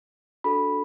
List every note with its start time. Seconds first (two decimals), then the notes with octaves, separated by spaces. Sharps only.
0.44 D4 F#4 A4 B5